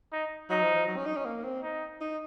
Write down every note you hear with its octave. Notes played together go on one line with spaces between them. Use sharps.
D#4
F#3 D#4
F3
F3
F#3
C#4
D#4
C#4
A#3
C4
D#4
D#4